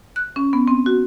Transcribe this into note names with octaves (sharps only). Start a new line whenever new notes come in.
F#6
C#4
B3
C4
F#4